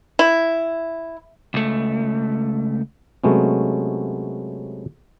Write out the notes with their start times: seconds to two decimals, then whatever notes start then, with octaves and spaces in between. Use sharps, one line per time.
0.19 E4
1.54 C#2 A3
3.24 C3 F#3 G#3 A3 B3 C#4